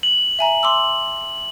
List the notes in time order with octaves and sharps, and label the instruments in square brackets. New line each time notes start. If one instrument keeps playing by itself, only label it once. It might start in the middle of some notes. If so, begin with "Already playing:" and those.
[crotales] F#7
[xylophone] E5 G#5 A#5
C6 D6 E6